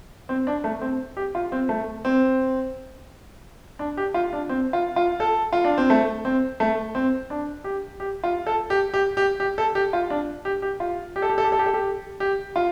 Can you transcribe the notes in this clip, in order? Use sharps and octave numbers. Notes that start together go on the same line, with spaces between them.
C4
D4
A3
C4
G4
F4
C4
A3
C4
D4
G4
F4
D4
C4
F4
F4
A4
F4
D4
C4
A3
C4
A3
C4
D4
G4
G4
F4
A4
G4
G4
G4
G4
A4
G4
F4
D4
G4
G4
F4
G4
A4
G4
A4
G4
A4
G4
A4
G4
G4
F4